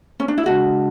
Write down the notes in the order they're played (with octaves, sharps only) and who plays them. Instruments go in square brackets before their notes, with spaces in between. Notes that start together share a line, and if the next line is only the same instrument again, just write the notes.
[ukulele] C#4
D4
E4
[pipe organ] C#3 G#3 D4 [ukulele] F#4